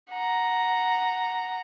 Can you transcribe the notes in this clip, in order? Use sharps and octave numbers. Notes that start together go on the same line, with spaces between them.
F#5 A#5